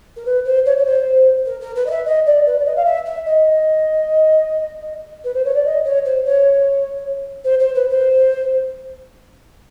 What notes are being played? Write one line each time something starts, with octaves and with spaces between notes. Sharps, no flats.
A#4
B4
C5
C#5
C#5
C5
A#4
A#4
B4
D#5
E5
D#5
D5
B4
D5
D#5
F5
E5
E5
D#5
B4
C5
C#5
D5
D#5
C#5
C5
C#5
C5
C5
B4
C5